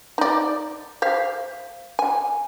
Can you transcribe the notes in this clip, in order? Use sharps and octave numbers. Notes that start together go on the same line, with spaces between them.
D#4 D5
C5 E5 F5
G#5